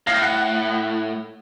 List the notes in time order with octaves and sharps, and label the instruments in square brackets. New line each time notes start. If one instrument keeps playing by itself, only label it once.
[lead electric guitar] A2 [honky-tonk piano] F5 A#6
[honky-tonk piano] F#5